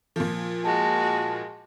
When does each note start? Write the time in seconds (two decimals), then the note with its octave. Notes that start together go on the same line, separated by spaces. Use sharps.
0.16 A#2 F3
0.64 G#3 F#4 A5